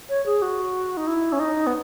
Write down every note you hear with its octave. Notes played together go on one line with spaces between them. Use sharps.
C#5
G#4
F#4
D#4
E4
C#4
D#4
B3